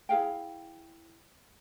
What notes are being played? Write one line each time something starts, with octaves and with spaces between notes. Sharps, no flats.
E4 G#4 F5 G5